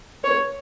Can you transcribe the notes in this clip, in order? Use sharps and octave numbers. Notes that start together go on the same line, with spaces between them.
C#5